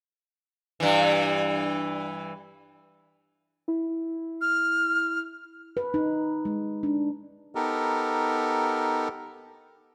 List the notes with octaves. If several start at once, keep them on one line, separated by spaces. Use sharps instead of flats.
G2 E3
E4
F6
B4
D#4
G#3
D4
B3 D#4 G4 A4 A#4